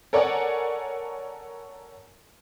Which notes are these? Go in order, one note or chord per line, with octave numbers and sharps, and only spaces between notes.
A4 A#4 C#5 D5 F#5 G#5